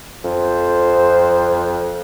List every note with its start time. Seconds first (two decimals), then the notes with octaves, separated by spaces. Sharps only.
0.24 F2 C5